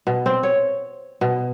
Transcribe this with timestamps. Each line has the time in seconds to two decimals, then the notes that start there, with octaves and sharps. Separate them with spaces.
0.07 B2
0.26 C4
0.43 C#5
1.21 B2